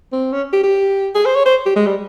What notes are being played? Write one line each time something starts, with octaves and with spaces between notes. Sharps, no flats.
C4
C#4
G4
G4
G#4
C5
C#5
C5
G4
G#3
G3